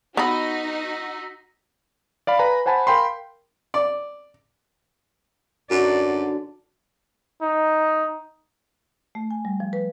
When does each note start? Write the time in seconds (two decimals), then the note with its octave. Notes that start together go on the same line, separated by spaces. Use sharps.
0.17 B3 D#4 F#4 B5 E6 A#6 B6
2.27 D5 F5 B5
2.39 B4 G#5 A#5 B5
2.66 C5 F#5 G#5 A5 B5
2.87 A#4 F5 G5 B5 C6
3.74 D5
5.71 F#2 D3 F#3 D#4 F#4 D5
7.42 D#4
9.15 A3
9.31 G#5
9.45 G3
9.60 F3
9.73 B4